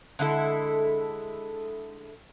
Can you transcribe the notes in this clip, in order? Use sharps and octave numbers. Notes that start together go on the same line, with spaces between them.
D3 G#3 E4 A4